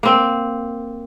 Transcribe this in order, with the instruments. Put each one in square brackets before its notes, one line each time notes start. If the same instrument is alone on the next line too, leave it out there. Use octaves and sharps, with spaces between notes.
[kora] A#3 C4